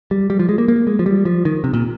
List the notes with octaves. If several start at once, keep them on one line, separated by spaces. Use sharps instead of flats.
G3
G3
F3
G#3
A#3
A#3
G#3
F3
G3
F3
D#3
C3
A#2